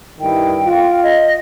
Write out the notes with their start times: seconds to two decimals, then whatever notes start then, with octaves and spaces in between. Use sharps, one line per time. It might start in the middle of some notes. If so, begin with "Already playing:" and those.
0.21 G2 D#3 E4 G5
0.65 F4
1.03 D#5